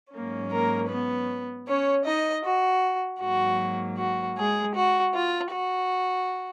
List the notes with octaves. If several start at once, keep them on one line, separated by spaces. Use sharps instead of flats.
G#2 F#3 A#3 C#4
A#3 A#4
B3 B4
C#4 C#5
D#4 D#5
F#4
G#2 F#3 A#3 F#4
F#4
G#3 G#4
F#4
F4
F#4